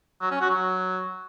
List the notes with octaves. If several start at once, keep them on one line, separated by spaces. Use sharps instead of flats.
F#3
C#4
F#4
F#3